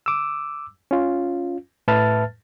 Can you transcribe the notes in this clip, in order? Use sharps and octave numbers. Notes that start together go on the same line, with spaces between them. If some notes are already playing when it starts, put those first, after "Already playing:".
D6 E6
C#4 F4
A2 B4 E5 A5 F6 A6